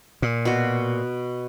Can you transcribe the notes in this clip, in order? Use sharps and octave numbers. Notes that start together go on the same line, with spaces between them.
A#2
B2 F#4